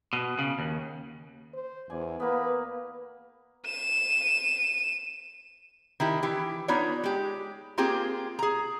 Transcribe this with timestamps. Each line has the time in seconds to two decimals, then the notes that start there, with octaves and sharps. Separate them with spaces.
0.13 B2
0.39 C#3
0.59 D#2
1.54 C5
1.90 E2 D5 G#5
2.20 A#3 B3 B4
3.66 D#7 E7
6.00 D#3 E4 G4
6.23 E3 G4
6.68 B3 D4 D#4 F4 C#5 D5
7.04 G#3 G4
7.78 A#3 C4 F4 G4 G#4
8.39 G#4 A#5